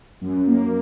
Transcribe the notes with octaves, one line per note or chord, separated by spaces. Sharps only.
F#2
A#3